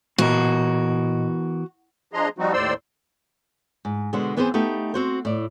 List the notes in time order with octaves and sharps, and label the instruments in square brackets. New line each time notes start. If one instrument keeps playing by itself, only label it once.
[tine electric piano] A#2 D#5 [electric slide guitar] E3 B3 A#4 [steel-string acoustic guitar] F#4
[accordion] F3 D4 G#4 D#5 A#5 C6
F3 G3 C4 D#4 F#4
D#2 A2 C5 D5 C6 E6
[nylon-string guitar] G#2
B2 D3 G#3 C5 F#5
E3 B3 C4 G#4 A#4 C5
A3 B3 D#4 G4 A4
C4 F#4 C5
A2 D5